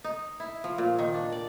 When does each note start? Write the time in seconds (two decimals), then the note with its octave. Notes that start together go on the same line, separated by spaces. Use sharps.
0.04 D#4
0.40 E4
0.64 F3
0.78 A#2
0.99 D#3
1.14 D4
1.32 D5